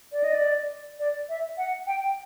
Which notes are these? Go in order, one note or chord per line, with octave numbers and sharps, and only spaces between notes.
D5
D#5
D5
D5
E5
F#5
G5